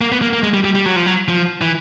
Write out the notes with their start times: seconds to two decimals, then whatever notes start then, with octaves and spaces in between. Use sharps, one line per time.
0.01 A#3
0.12 B3
0.22 A#3
0.33 A#3
0.43 G#3
0.54 G3
0.65 G3
0.75 G3
0.86 F#3
0.96 F3
1.06 F#3
1.29 F3
1.61 E3